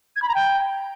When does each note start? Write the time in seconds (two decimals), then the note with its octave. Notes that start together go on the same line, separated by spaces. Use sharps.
0.16 G#6
0.22 B5
0.28 A#5
0.35 G5